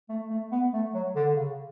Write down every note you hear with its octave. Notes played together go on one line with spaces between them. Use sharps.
A3
A3
B3
A3
F#3
D3
C#3